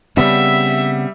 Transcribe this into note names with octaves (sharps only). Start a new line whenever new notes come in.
C#3 G3 B3 C4 E5